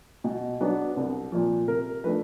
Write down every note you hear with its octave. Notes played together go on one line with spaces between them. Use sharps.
B2
F#3 B3 D4
C2
A#2 F3
C3 A#4
F3 A3 D4 B4